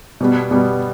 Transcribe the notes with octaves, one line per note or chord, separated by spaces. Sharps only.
B2 G3 B3
B2 G3 B3